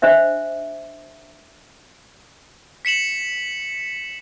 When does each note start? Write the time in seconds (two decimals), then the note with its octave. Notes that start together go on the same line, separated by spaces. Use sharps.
0.02 D4 C5 D#5 E5
2.85 B6 C#7 E7 F#7